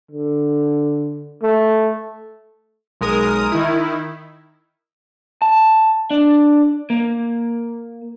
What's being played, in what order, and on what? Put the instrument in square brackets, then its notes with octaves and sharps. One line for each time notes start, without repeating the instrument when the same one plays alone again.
[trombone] D3
A3
[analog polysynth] B1 G#3 A#4 D#6
D#3 E4
[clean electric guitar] A5
D4
A#3